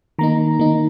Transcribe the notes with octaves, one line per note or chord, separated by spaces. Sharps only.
D#3 A#3 D#4 A#5
D#3 A#3 D#4